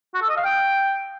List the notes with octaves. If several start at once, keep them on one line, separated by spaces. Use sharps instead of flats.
F#4
A4
D#5
F5
G5